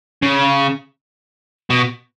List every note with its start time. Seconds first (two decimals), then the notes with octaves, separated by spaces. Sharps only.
0.23 C#3
1.70 B2